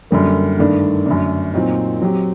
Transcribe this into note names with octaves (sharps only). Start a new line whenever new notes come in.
F#2 D3 G3 A#3
G2 D#3 A3 D4
F#2 D3 A3 D4
A#2 F#3 C4 D#4
F#3 C4 G4